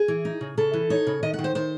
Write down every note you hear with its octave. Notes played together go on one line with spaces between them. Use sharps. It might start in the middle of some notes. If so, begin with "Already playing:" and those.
Already playing: G#4
E3
D#4
C#3
C#3 A4
E3
D#4 C#5
C#3
D#3 D#5
F#5
D#3
C5
D#3 C5